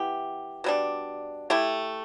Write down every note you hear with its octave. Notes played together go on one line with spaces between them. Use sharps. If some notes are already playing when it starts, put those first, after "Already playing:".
Already playing: E3 B3 E4 G4
B2 G3 D4
A3 E4 G4